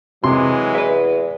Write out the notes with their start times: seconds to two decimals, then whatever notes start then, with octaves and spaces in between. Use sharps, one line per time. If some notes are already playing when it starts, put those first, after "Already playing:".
0.24 C3 E3 F#3 G#3 C6
0.75 E2 B4 E5